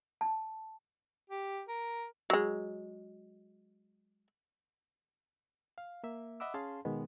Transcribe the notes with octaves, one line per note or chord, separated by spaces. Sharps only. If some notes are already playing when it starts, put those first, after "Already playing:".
A5
G4
A#4
F#3 G#3
F5
A#3 E5
D#5 E5 F#5 B5 D6 E6
C#4 G#4 F5 A5 C6
B2 D#3 G#3 B3